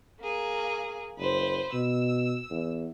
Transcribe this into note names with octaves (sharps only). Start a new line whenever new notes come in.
A#3 G#4
F#1 B4 C5
B2 E6
E2